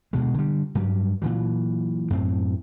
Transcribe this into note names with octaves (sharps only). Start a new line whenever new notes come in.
D2 B2 G#3
D3 G3
G2 F#3 G3
A#2 E3 F#3
F#2 A2 C4